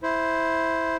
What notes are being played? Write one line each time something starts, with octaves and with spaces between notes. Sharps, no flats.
E4 C5